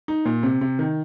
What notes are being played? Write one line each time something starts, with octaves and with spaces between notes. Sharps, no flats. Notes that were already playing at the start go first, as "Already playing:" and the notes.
D#4
A#2
C3
C3
D#3